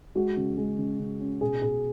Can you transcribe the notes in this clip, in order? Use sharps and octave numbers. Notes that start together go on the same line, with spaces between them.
G#3 F#4
C#3
G#3
C#3
C#3
C#4
B2 G#4
B2 G#4